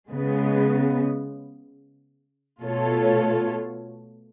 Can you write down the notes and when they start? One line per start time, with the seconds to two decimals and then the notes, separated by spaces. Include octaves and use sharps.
0.11 C#3 G#3 B3
2.63 B2 A3 F4 A4 C#5